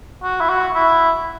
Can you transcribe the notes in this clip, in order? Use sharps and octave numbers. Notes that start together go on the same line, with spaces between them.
F#4
E4
F#4
E4